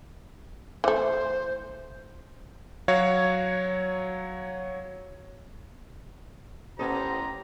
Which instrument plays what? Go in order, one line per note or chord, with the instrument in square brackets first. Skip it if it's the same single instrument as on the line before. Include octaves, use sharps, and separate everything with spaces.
[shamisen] E3 A3 [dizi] C5
[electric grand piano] F#3 F#4 C#5 F5
[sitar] A2 B3 D#5 [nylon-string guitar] C#4 A4 [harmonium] G4 C5 [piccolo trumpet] A#5